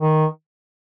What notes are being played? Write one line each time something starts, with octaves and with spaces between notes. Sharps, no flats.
D#3